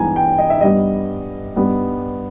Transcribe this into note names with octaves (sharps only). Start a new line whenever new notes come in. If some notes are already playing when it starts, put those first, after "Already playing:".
Already playing: G2 E3 G#3 B3 G#5 A#5
G5
D#5
E5
G2 G3 B3 D#5
G2 G3 B3